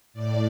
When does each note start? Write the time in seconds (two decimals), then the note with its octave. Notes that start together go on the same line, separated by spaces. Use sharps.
0.13 A2 D5